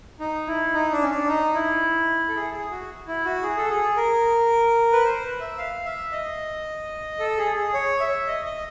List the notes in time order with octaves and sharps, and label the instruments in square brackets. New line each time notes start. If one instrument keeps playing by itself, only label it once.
[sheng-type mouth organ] D#4
E4
D#4
D4
C#4
D4
D#4
E4
A4
G#4
G#4
F#4
E4
F#4
G#4
A4
G#4
A#4
B4
C5
B4
E5
F5
E5
D#5
A4
G#4
G#4
C#5
E5
D#5
D#5